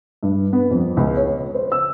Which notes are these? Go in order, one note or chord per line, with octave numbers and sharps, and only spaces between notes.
G2
B3
F2
C#2
C#5
C5
E6